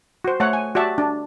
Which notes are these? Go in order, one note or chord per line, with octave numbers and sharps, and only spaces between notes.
F#4 C5
A3 C#5 F#5
G#5
F#4 G4 D5 E5 A5
D4